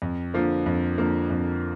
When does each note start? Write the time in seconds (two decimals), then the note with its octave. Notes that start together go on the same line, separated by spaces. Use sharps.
0.02 F2
0.34 D3 F3 A#3
0.66 F2
0.98 D3 F3 A#3
1.30 F2